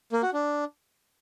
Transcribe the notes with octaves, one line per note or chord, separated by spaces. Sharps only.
A#3
F#4
D4